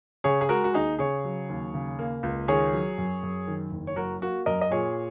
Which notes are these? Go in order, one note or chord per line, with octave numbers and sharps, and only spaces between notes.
C#3 G#4 C#5
G#4
G#3 F#4 A#4
F#4
D#2 D#4 G#4
C#3 G#4 C#5
F#3
D#2
C#3
A#3
C#2
D#3 G#4 C#5
F#3
F#2
F#2
D#3
F#1
C#5
F#3 F#4 A#4
A#3 F#4
F#2 A#4 D#5
D#5
A#2 G#4 C#5